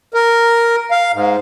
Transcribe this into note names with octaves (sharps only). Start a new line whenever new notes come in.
A#4
F5
G#2